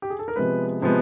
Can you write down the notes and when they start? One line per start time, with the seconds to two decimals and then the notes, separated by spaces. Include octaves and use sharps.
0.02 G4
0.10 G#4
0.19 A4
0.28 A#4
0.36 C3 F3 G#3 B3 B4
0.82 C3 F3 G#3 B3